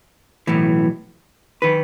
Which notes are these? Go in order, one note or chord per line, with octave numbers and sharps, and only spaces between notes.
B1 A2 E3
D#3 B4